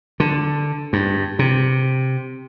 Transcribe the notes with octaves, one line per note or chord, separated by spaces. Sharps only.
D3
G2
C3